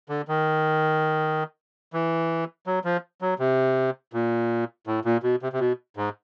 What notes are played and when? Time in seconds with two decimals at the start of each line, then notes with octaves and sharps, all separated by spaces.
0.09 D3
0.28 D#3
1.93 E3
2.66 F#3
2.84 F3
3.21 F#3
3.39 C3
4.13 A#2
4.87 A2
5.05 A#2
5.23 B2
5.42 C3
5.52 C3
5.60 B2
5.96 G#2